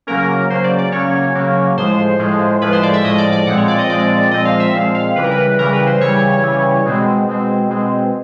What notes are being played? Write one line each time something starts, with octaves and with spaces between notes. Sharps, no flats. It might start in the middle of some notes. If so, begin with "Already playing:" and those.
C#3 F#3 A#3 C#4 A#4
C#3 F#3 A#3 C#4 C5
D5
D5
C#3 F#3 A#3 C#4 C#5
C#3 F#3 A#3 C#4
A2 F3 G#3 C5
A2 F3 G#3
A2 F3 G#3 B4
C5
D5
E5
A2 F3 G#3 D#5
D5
D5
A#2 F3 G#3 C4 F#5
C#5
D5
D#5
A#2 F3 G#3 C4 D5
A#2 F3 G#3 C4 D#5
F5
E5
A#2 F3 G#3 C4 F5
F5
C#3 E3 G3 B4
A#4
B4
C#3 E3 G3 A#4
B4
C5
C#3 E3 G3 C#5
C#3 E3 G3
B2 G#3 C4
B2 G#3 C4
B2 G#3 C4